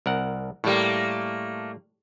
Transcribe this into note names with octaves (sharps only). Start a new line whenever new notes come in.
C2 A#4 F#5
A2 G3 A3 A#3